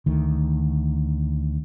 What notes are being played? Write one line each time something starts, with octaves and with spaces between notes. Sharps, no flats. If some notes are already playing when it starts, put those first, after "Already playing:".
D2 D#3